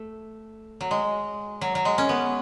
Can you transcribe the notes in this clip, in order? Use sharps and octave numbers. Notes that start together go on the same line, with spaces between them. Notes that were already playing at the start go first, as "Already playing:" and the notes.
Already playing: A3
F#3
G#3
F#3
F#3
G#3
C#4
B3